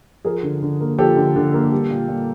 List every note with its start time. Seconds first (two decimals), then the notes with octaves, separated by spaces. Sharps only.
0.25 F3 G#4 A#4
0.43 D3
0.62 D3
0.81 A#3
0.99 F3 G4 A4
1.16 D3
1.36 D3
1.54 A#3
1.72 G3
1.91 A#2
2.09 A#2